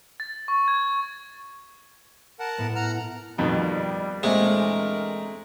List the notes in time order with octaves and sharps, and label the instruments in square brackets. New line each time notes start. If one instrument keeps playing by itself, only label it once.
[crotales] A6
C#6
G#6
[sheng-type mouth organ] A#4 F#5 A5
[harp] A2 B3
[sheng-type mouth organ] F#5 A#5 F6
[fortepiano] F2 B2 D#3 [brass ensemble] G3
[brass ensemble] E2 D4 A#4 [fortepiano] A#2 [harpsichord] G#3 [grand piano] A3 C4